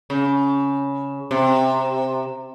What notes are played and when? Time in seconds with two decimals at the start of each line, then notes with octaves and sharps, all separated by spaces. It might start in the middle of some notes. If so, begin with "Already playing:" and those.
0.10 C#3
1.31 C3